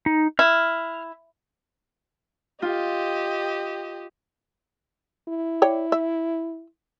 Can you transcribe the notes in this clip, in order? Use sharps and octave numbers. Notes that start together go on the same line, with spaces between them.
D#4
E4 F6
F4 G4 D#5
E4
C#5 D5 G5
E5